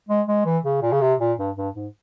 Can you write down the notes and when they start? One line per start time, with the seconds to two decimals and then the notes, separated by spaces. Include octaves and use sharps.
0.09 G#3
0.27 G#3
0.45 E3
0.64 C#3
0.82 A#2
0.92 C#3
1.01 C3
1.20 A#2
1.39 G2
1.56 G2
1.75 G#2